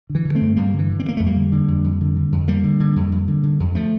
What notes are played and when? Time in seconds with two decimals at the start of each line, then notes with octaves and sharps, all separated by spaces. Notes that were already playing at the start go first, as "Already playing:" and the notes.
0.10 D3
0.15 E3
0.25 D3
0.35 A3 C4
0.41 G2
0.56 G2 G3 A#3
0.73 D3
0.79 E3
0.89 D3
0.99 C4
1.05 G2
1.08 A#3
1.17 F2 A3
1.26 G3 A#3
1.36 D3
1.52 D3
1.68 F2
1.84 F2
2.01 D3
2.16 D3
2.32 F2
2.47 F2 G3 A#3
2.64 D3
2.80 D3
2.96 F2
3.12 F2
3.28 D3
3.43 D3
3.60 F2
3.75 F3 A3